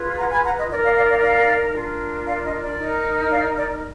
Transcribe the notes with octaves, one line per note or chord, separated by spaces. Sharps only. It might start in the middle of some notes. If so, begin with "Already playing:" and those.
Already playing: F4 G#4 B4
F#5 A#5
G#5 B5
F#5 A#5
D#5
D#4 A#4 D5
D5 F5
D5 F5
D5 F5
D5 F5
D4 F4 A#4
D5 F5
D#5
D5
D#4 A#4
D5 F5
D5